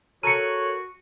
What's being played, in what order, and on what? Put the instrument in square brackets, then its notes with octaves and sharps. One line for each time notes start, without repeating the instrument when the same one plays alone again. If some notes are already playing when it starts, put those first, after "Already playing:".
[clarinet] F#4 [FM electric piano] A4 A#4 [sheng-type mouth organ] C#5 F#6 [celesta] C#7 D#7